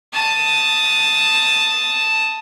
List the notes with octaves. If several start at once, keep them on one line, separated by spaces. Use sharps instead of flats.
A5 D#6